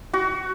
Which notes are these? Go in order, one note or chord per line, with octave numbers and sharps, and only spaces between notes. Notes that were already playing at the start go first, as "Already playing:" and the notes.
F#4